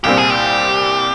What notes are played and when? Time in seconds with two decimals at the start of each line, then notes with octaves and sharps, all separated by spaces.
0.04 C2 A#2 G3 C4 G4
0.17 G#4
0.30 G4